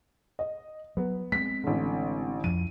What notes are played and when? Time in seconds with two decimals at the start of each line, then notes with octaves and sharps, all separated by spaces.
0.39 D#5
0.97 F#3 B3
1.32 G#3 C4 B6
1.64 A1 D3
2.44 F2 F3 D#7